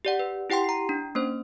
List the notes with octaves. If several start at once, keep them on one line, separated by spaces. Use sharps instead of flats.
G4 D5 F#5
B4
E4 G4 F#5 G5 C6
A#5 C7
D4
A#3 C#4 C5